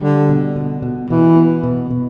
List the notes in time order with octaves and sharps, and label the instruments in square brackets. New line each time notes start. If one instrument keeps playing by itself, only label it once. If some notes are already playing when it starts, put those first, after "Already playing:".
[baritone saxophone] D3 [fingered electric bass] G3
[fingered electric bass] B2
B2
B2
[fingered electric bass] B2 [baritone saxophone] E3
[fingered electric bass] B3
B2
B2